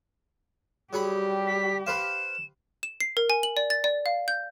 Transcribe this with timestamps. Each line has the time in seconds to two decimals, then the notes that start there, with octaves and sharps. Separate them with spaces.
0.93 F#3 G3 G4 G#4 B5
1.47 B6
1.87 B4 C5 F5 E7
2.83 E7
3.00 C7
3.17 A#4
3.30 G#5
3.43 F#7
3.57 D5
3.70 A6
3.84 D5
4.06 F5
4.28 G6